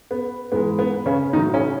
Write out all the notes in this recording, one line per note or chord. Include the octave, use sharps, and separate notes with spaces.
B3
G#2 E3 G#3 B3
B3
C#3 C#4
A2 D#3 F#3 D#4
C#3 C#4